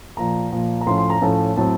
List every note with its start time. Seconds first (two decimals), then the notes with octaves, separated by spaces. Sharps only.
0.17 A#2 F3 A#3 A#5
0.52 A#2 F3 A#3
0.81 A#5
0.87 A2 F3 A3 C#4 C6
0.98 C6
1.10 A#5
1.22 A2 F3 A3 C#4 A5
1.56 A2 F#3 C4 A5